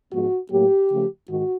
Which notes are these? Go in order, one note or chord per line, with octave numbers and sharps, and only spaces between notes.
G#2 F3 G#3 B3 F#4
A2 F#3 A#3 G4
C#3 F3 A3
G#2 D#3 F#4